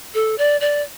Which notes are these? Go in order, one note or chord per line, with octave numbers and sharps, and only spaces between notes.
A4
D5
D5